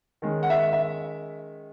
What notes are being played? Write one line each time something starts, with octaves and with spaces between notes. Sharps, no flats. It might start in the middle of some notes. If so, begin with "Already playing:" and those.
D#3 G#3 C#4
F#5
E5
E5